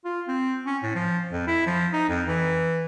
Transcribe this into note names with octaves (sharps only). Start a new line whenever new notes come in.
F4
C4
C#4
A2
F3
F2
E4
F3
D#4
F2
E3